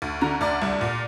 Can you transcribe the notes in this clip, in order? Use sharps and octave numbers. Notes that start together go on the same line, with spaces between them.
D2
D3 A#5
D2 D5
C2
A#2